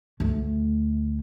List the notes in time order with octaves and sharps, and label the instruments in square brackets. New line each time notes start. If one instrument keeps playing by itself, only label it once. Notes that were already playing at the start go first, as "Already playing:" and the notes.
[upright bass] D2 A3